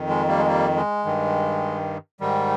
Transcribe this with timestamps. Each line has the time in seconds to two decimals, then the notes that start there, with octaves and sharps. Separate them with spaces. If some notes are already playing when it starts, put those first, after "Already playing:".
Already playing: F2 D#3
0.09 G#3
0.28 G3 A#3
0.38 G#3
0.46 G3 A#3
0.76 G#3
1.05 G2 D#3
2.20 G#2 D#3 G3